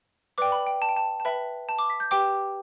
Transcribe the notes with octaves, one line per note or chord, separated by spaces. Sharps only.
B4 D5 G5 D6
B5
G5
A5
G5
A5
A5
B4 E5 G5 B5
A5
D6
B6
G6
G4 B4 G5 D6